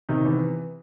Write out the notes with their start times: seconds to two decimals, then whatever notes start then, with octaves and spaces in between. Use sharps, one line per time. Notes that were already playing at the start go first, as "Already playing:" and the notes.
0.09 C3 D#3 D#4
0.25 E3 B3